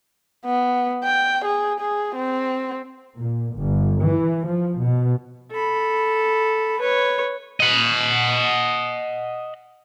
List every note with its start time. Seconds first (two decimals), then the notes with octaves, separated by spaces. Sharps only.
0.46 B3
1.04 G5
1.45 G#4
1.80 G#4
2.16 C4
3.19 A#2
3.57 G1
4.04 E3
4.49 F3
4.82 B2
5.51 A4 B5
6.80 B4 C#5
7.60 D#5 F#5